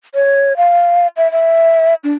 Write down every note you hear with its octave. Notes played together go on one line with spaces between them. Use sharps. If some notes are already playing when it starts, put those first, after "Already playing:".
C#5
F5
E5
E5
D4